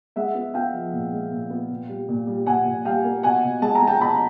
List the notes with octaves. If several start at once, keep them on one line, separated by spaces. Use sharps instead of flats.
G#3 E5 F#5
B3
B3 F5 G5
F3
A#2
G#3
A#2
B3
A#2
G3
A#2
G3
A#2 F#5 G#5
A#2
G3 F5 G5
A#3
B2 F#5 G#5
B2
G#3 A5
A#5
G#3
G5 A5
B2 A5 B5